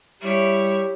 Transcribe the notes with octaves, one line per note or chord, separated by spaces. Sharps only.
G3 E4 G4 C#5